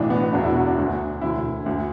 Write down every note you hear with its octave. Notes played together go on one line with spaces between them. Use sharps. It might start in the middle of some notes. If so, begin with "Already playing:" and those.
Already playing: B1 A2 E3 D4
B3
B3
E1 E2 B2 D4
E4
F#4
D4
D2 D3
E1 D2 D3 E4
D2 D3